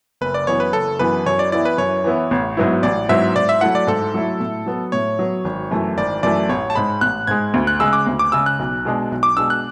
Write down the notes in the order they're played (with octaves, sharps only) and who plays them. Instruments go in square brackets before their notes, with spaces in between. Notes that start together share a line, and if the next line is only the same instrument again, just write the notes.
[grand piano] F#1 [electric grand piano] B4
[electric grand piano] D5
[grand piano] F#2 E3 B3 [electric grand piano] C#5
[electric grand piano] B4
[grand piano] F#1 [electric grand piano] A4
[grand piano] F#2 E3 B3 [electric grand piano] B4
[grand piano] F#2 [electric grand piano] C#5
[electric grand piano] D5
[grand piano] E3 B3 E4 [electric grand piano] D5
[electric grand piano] B4
[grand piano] F#2 [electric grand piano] C#5
[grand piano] E3 B3 E4
A1
G#2 F#3 B3 E4
[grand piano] A1 [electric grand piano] D5
[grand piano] G#2 F#3 B3 E4 [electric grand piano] E5
[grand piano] G#2 [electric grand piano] D5
[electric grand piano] E5
[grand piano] F#3 A3 E4 [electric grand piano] F#5
[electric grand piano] D5
[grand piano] G#2 [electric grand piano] A4
[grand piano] F#3 A3 E4
A2
F#3 B3
[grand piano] A2 [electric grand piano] C#5
[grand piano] F#3 B3
G#1
F#2 E3 A3
[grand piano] G#1 [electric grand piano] D5
[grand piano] F#2 E3 A3 [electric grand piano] D5
[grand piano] A1 [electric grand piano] C#5
[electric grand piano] A5
[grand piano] G#2 G#3 [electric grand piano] B5
[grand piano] A1 [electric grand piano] F#6
[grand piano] G#2 G#3 [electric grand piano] G#6
[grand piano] D2
[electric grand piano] F#6
[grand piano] C#3 G#3 [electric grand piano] E6
[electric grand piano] D6
[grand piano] D2
[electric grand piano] D6
[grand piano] C#3 G#3 [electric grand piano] E6
[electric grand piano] F#6
[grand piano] B1
B2 G#3 D4
B1
[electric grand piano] D6
[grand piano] B2 G#3 D4 [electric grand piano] E6
[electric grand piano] F#6